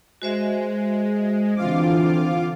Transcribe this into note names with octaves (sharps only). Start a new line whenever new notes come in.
G#3 F#4 C5 E5
D3 E3 C4 F4 F5 D6